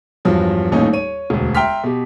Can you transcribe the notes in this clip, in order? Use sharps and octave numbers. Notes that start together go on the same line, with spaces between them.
E2 G2 F3 F#3
D#1 D#2 A2 C#4 D#4
C#5 D#7
E1 D2
E5 G5 A#5 C6 F6 B6
B2 G4